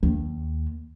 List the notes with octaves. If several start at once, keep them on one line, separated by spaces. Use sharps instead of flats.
D#2